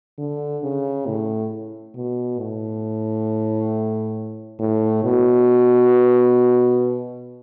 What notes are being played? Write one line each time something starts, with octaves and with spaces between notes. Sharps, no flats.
D3
C#3
A2
B2
A2
A2
B2